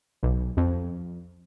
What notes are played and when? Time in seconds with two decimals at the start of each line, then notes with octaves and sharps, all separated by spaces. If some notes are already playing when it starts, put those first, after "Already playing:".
0.23 B1
0.57 F2